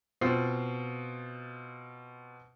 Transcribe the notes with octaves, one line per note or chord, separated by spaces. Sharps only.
B2 C4 F4 C7